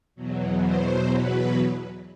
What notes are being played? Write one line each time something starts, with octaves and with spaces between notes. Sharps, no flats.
E2 B2 F#3
C5
B4